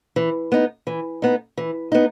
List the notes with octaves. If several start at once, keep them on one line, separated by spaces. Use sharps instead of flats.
E3
B3 D#4
E3
B3 D#4
E3
B3 D#4